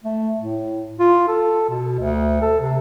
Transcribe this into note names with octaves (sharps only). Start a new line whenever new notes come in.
A3
A2
F4
A4
B2
D2
A4
C3